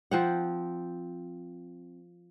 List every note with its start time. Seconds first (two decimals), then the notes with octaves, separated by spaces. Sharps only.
0.11 F3 C4 F#5